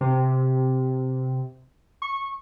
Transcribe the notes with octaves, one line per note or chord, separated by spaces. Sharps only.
C3
C#6